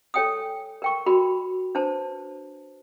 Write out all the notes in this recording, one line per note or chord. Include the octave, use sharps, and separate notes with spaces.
A4 C#5 G5 G#5 D#6
A#4 G5 C#6
F#4 A#4 B5
D4 B4 C5 A5